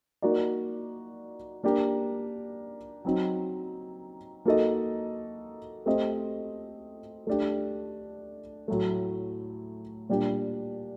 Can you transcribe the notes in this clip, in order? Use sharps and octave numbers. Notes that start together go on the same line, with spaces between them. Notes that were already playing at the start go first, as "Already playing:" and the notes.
A#3 D#4 F#4 A#4 D5
A#3 D4 G4 A#4
F#3 C4 D#4
A#3 D#4 F#4 A4 D#5
A3 C4 G4 C5 D#5
A3 D4 G4
A2 F#3 A3
A#2 G3 D4 G4